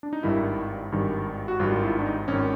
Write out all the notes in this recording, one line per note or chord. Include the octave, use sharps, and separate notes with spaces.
D4
D#4
G#1 G2 D#3 E4
G#1 G2 D#3
F#4
G#1 G2 D#3 F4
F4
E4
D4
D#4
G#1 D#3 C#4